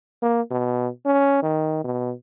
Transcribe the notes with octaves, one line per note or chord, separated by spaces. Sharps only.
A#3
B2
C#4
D#3
B2